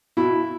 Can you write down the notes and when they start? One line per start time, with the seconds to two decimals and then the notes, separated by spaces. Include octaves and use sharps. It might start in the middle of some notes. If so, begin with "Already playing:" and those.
0.17 B2 E4